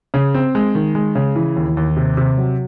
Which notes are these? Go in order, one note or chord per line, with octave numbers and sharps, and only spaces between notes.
C#3
C4
G#3
D#3
G#3
C#3
E3
D#2
D#2
C3
C3
F#3